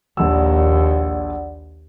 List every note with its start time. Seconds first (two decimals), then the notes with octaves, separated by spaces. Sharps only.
0.17 A#1 D#2 D5 F#5 E6